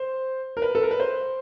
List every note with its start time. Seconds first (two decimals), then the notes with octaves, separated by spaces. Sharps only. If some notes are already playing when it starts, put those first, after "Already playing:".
Already playing: C5
0.57 A#4
0.62 B4
0.75 A4
0.83 A#4
0.91 B4
1.00 C5